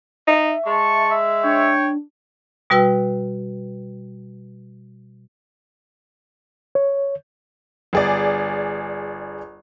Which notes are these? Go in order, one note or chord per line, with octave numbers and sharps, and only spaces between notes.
D#4 E5
G#3 A5 C#6
E5
D4 C#5 G5
B2 G3 F#4 B4 G5 E6
C#5
G1 G#4 D5